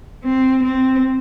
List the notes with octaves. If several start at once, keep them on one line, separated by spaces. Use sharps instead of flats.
C4
C4